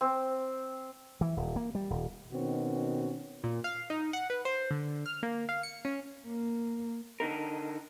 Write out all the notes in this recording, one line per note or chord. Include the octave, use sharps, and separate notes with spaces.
C4
E3
D#1
A#3
G3
D#1
B2 D#3 C4 C#4 F#4
A#2
F5
D#4
F#5
B4
C5
D3
F6
A#3
F5
C#7
C#4
A#3
D3 D#4 A#4